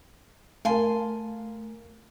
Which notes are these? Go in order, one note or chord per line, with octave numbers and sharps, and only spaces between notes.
A3 A#4 F5 G#5 A5 C6